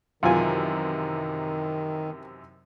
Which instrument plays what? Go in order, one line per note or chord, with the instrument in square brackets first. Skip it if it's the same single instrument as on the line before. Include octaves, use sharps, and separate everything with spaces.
[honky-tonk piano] F#2 C3 E3 [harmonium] D#3 [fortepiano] F4 G#5